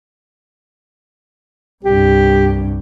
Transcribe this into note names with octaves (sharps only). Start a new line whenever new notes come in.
C2 G2 G4